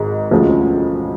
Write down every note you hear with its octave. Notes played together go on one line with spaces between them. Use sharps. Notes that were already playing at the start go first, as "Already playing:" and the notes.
Already playing: G#1 G#2
E1 D2 C#3 F3